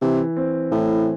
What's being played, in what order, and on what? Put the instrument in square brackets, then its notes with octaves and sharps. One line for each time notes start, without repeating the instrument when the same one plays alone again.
[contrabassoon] C3 [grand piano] E3
[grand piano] C4
[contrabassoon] A2 [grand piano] E3